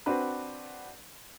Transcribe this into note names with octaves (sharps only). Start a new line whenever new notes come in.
C4 D4 F#4 B4